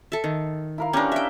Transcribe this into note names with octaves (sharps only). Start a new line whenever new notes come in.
A4 E5
D#3
E4 A#4 F5
C#4 D4 G4 A#4 B4
E5 G5